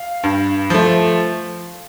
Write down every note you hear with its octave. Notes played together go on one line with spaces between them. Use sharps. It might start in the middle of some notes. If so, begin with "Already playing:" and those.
Already playing: F5
G2
F3 A3